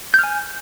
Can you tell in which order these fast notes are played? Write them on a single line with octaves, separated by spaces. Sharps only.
G6 F6 G#5